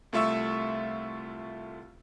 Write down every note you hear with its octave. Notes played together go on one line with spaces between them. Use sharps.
C2 A3 F4 E5 C#6 E6